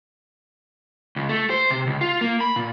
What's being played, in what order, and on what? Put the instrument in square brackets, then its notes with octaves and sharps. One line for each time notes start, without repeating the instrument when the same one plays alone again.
[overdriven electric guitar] C#2
A3
C5
C3
C#2
F4
A#3
B5
A#2